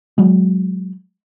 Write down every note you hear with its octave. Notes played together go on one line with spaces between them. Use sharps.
F#3 G#3